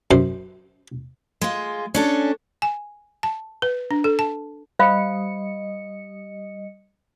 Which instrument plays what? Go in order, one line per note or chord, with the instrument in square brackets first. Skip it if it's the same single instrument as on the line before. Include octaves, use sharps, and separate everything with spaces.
[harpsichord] F#2 C5
[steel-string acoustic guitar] G#3 F4
C#4 D4 A4
[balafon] G#5
A5
B4
D4
A4
A5
[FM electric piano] G3 D#5 C#7 [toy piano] C5 F5 B5